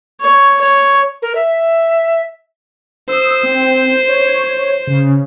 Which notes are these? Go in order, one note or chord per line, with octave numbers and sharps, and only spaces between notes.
C#5
C#5
A#4
E5
C5 D#6 E6
C4
C#5
C#3